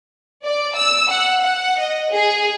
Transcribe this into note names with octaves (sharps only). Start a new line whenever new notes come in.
D5
E6
F#5
F#5
D#5
G#4